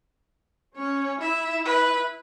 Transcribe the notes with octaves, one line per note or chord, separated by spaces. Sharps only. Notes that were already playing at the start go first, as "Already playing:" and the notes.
C#4 C#5
E4 E5
B4